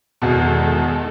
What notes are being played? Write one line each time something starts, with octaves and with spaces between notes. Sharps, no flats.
E2 B2 D#3 G#3 A4